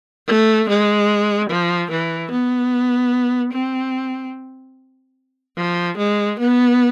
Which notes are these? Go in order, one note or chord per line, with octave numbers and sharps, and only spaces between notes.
A3
G#3
F3
E3
B3
C4
F3
G#3
B3